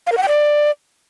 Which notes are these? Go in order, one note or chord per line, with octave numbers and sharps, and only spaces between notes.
F5
A#4
F#5
G5
D5